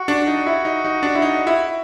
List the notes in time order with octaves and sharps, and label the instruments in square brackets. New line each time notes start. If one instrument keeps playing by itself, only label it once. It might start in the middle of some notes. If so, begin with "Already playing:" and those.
Already playing: [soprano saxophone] F#4
[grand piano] D4
D#4
E4
D#4
D#4
D4
E4
D#4
E4